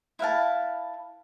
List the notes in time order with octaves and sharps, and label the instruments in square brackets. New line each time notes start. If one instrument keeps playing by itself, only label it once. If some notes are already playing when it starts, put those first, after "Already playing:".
[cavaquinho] E4 B4 F5 A5